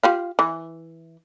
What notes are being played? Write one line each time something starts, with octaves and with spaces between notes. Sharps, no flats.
F4 G4 F5
E3